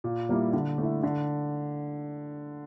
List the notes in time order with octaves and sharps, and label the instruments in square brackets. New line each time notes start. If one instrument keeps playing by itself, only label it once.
[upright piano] A#2
G3 A#3 E4
D3
A3 E4
D3